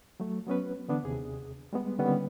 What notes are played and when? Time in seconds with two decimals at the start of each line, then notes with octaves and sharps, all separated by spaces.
0.20 F#3 A3
0.47 F#3 B3 C#4 B4
0.88 D3 E3 B3 D4
1.03 D#2 C3 G#4
1.73 G3 G#3 B3
1.99 D3 D#3 G3 A#3 B3 C#4